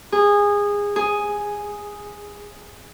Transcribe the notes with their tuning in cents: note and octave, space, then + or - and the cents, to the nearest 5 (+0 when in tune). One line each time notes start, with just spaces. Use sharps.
G#4 -20
G#4 +0